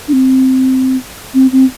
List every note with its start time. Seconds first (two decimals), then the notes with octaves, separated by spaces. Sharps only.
0.08 D4
0.13 C4
1.34 C4
1.52 C4